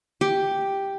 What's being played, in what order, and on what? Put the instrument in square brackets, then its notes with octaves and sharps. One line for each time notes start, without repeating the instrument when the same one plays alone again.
[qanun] G4